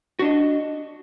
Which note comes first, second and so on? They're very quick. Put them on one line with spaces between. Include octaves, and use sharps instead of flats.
F#4 D4 D#5